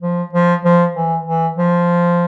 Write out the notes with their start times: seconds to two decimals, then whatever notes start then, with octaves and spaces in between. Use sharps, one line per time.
0.02 F3
0.34 F3
0.65 F3
0.95 E3
1.26 E3
1.57 F3